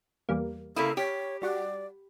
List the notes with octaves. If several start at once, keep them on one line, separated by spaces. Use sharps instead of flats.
E2 G3 A#3
C#3 A#3 E4 A4 B5 D#6
G4 C#5 B6
G3 F#4 D5 F#5